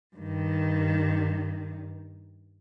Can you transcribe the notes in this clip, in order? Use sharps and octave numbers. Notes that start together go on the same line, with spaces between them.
G2 D#3